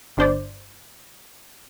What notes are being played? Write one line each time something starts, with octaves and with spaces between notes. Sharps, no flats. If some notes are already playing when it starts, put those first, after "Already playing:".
G1 D4 C5 D5